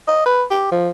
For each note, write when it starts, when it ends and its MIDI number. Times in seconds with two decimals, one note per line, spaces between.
0.08 0.24 75
0.26 0.44 71
0.51 0.70 67
0.71 0.90 53